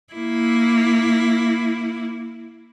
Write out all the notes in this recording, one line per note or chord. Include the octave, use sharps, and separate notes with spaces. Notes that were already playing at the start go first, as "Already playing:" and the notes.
A#3 E4